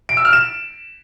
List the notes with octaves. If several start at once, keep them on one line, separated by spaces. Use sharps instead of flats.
D7
E6
F6
E7